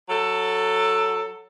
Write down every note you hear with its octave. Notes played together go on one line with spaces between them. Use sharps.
F#3 A4